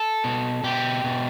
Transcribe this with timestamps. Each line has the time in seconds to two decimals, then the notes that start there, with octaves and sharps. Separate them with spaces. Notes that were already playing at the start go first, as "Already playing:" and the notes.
Already playing: A4
0.24 B2
0.64 B2 G4
1.04 B2